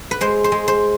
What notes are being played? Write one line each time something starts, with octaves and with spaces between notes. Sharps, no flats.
B4
G#3 C5
C5
G#3
C5